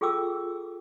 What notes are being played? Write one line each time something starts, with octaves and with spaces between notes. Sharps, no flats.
F4 G#4 A4 G5 D6 E6